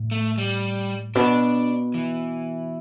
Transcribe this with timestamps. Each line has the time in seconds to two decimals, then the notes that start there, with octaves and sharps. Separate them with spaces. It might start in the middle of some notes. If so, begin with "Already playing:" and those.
Already playing: A2
0.11 A3
0.38 G3
1.15 B2 D4
1.94 E3